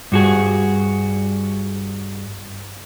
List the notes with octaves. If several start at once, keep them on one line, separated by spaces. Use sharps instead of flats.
G2 F#4 G#4